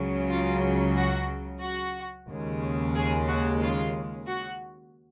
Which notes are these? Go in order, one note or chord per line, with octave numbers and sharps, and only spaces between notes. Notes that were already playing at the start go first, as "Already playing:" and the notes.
Already playing: C#2 C#3 F#3
F4
F#4
F#4
D#2 C#3 G#3
G#4
F#4
F4
F#4